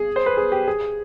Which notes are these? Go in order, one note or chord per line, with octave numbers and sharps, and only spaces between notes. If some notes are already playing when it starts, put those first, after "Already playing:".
Already playing: G#4
C5
B4
G#4
G4
G#4